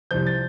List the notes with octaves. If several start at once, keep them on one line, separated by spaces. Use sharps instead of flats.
C2 C3 F3 G6
A6